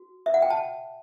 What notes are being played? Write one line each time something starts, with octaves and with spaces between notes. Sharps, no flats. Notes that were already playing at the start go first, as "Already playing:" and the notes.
Already playing: F#4
E5
F#5
G5
A5